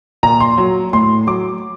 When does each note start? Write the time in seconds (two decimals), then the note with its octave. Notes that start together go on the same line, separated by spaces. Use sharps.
0.23 A#2 A#5
0.40 C6
0.58 F#3
0.93 A2 C6
1.27 F#3 D6